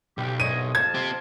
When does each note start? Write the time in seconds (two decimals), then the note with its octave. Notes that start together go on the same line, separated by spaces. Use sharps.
0.18 B1 G4
0.40 C2 C#5 D#5 D#7
0.75 F2 A#3 A5 G#6
0.95 C4 G4